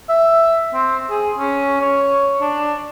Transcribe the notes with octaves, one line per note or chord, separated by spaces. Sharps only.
E5
C4
G#4
C#4
C#5
D4